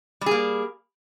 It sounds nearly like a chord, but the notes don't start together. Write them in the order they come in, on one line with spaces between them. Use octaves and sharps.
G3 G#4 A#3